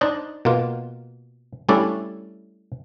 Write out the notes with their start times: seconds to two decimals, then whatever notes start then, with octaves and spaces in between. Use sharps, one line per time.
0.01 D4 D#4 C5 D5 D#5
0.45 B2 A#3 F4
1.69 G3 A3 C#4 D4 E4 D5